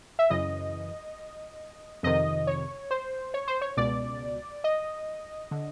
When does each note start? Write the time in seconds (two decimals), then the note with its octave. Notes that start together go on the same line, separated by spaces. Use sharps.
0.19 E5
0.30 F#2 C#3 E3 D#5
2.03 F2 C3 D#3 D#5
2.47 C#5
2.91 C5
3.34 C#5
3.48 C5
3.61 C#5
3.77 C#2 B2 D5
4.64 D#5
5.51 D3